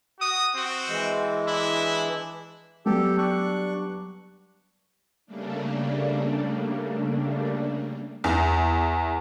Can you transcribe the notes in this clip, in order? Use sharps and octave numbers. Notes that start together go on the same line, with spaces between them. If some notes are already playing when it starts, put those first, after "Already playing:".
F#4 D#6
C4 F#4
E3 G#3
D4 E4
F#3 G3 B3 G4 A4
D4 C#6 F#6
C#3 G3 A3 A#3 D4
E2